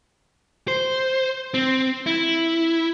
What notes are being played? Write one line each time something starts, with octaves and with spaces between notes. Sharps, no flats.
C5
C4
E4